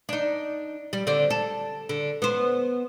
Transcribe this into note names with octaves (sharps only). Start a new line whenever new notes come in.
D4 D#4
G3
D3 C4 D5
A4
D3
B3 C5